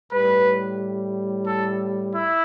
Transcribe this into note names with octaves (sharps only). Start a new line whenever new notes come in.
A2 G3 B4
A4
E4